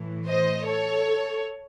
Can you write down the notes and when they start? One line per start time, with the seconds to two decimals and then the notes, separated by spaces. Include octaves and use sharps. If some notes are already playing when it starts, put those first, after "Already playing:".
Already playing: A2 E3
0.26 C5 D#5
0.66 A4 C#5